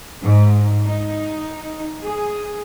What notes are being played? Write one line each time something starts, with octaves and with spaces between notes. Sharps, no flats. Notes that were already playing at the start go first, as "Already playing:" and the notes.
G#2
D#4
G#4